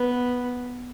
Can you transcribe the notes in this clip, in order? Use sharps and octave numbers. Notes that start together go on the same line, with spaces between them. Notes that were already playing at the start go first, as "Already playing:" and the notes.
Already playing: B3